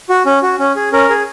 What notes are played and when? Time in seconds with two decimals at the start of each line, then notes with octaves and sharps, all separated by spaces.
0.09 F#4
0.26 C#4
0.42 F#4
0.59 C#4
0.76 G#4
0.92 C#4 A#4
1.09 G#4